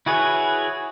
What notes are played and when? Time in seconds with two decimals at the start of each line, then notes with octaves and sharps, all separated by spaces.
0.06 E4 F#4 G#4 B4 C#5